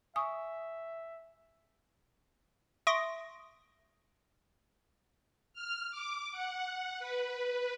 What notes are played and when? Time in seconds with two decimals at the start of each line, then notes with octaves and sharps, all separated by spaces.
0.16 E5 G#5 C#6 D#6
2.87 E5 C6 C#6 D#6 A#6 D7
5.54 F6
5.91 D6
6.32 F#5
6.99 B4